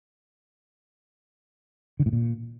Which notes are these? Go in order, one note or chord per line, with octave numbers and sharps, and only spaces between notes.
D3
A2
A#2